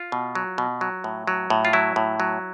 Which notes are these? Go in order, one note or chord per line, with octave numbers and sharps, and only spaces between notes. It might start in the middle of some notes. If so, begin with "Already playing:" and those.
Already playing: F4
B2
F#3
B2
F#3
A2
F#3
A2
F4
F#3 E4
A2
F#3